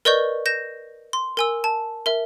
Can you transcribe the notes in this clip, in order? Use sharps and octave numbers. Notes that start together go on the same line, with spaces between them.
A#4 B4 D5 D#5 C#6 G6
G6 A#6 E7
C6
A#4 G#5 E6
A5
A#4 E5